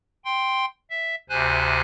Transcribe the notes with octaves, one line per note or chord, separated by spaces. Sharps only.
G5 C6
E5
D2 C3 C5 G#5 F#6